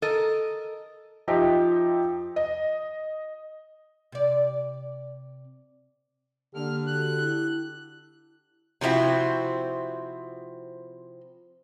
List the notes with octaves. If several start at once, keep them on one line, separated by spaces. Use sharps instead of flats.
A4 A#4 D#5
F3 D#4 G4 E5
D#5
C3 D5
D3 A#3 G4 F6
F#4 A4 F#6
E4
C3 F3 C4 E4 F#4